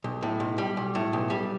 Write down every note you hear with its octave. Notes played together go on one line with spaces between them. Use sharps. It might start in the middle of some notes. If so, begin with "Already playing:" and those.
B1
A2
B1
G3
B1
A2
B1
G3